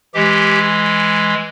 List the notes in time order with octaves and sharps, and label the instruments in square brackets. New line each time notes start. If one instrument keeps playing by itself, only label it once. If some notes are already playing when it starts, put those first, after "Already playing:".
[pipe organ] E3 G#3 G4